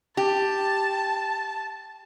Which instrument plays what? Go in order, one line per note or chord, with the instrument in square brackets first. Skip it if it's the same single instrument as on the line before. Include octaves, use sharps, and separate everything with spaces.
[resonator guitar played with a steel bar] G4 [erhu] A5